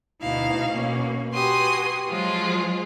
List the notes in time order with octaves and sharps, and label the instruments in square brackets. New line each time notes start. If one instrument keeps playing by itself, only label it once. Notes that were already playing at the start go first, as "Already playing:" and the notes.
[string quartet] D2 B2 D#4 E4 F5
B2 A#3 C#4
F#4 G4 B4 G#5 C6 D#6
F3 F#3 G#3 F4 G#4